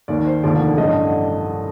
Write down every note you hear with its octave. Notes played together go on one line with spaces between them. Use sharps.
D#2 D#3 D5
C5
F1 D#2 D3 F3 D5
A1 G2 D3 D#5